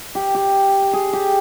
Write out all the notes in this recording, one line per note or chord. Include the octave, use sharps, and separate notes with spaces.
G4
G4
G#4
G4